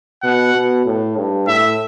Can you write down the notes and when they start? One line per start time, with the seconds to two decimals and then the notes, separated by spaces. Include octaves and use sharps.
0.23 B2 F#5
0.54 B2
0.86 A2
1.17 G2
1.48 A2 E5